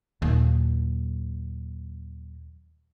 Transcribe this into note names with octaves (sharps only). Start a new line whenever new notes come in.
D#2 A#2 F#3